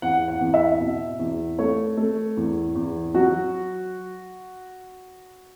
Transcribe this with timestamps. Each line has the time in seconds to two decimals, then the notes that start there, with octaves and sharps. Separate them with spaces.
0.02 E2 F#5
0.28 F#5
0.41 E2
0.54 E5
0.80 B2
1.19 E2
1.59 A3 C#5
1.97 A3
2.37 E2
2.75 E2
3.14 F#3 F#4